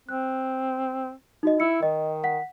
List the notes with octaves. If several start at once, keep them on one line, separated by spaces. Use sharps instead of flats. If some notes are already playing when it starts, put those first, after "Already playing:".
C4 F#6
D#4 F#4 D#5
E4 E6 C#7
D#3 D#5
F#5 B6